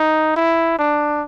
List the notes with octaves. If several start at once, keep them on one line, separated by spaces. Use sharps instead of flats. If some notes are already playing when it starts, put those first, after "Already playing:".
Already playing: D#4
E4
D4